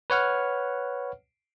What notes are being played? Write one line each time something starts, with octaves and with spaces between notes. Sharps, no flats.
B4 C#5 F#5 F6